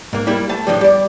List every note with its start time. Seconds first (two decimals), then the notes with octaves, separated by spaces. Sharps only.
0.13 G#2 A#3
0.27 G3 A#3 E4
0.49 A3 A5
0.67 A2 D3 F3 G3
0.81 G3 D5